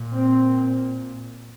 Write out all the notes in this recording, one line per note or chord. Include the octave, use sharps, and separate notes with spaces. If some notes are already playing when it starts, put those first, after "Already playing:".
Already playing: A#2
C4